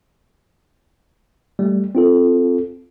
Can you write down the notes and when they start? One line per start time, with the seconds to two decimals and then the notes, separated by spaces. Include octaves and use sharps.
1.59 G3 A3
1.95 C4 F4 A4